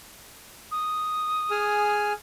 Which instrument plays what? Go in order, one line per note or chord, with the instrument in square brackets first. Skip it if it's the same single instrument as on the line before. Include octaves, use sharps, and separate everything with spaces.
[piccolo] D#6
[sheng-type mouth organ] G#4 G#5 F6